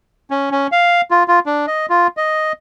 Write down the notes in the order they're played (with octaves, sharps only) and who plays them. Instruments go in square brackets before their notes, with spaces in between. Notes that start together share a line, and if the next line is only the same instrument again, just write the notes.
[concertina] C#4
C#4
F5
F4
F4
D4
D#5
F4
D#5